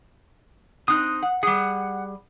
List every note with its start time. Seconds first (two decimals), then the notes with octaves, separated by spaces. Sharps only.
0.88 C4 D#4 D#6 F#6
1.23 F#5
1.43 G3 G#4 F#5